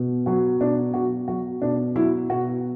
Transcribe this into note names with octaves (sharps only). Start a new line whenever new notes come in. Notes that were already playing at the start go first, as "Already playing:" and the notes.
Already playing: B2
F#3 F#4
B2 D4
B2 F#4
F#3 F#4
B2 D4
F#3 E4
B2 F#4